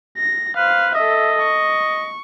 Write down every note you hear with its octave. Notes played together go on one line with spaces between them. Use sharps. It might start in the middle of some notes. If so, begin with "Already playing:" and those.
A#6
B4 C5 F5
A4 D#5 E5
C#6